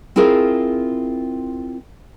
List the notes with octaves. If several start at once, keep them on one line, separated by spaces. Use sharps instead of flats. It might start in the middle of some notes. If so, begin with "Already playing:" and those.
C4 E4 F4 G#4 A#4